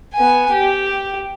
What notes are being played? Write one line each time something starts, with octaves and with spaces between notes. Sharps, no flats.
B3 G#5
G4